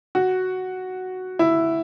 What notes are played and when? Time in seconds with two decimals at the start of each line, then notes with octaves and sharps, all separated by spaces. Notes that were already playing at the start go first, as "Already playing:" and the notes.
0.15 F#4
1.39 E4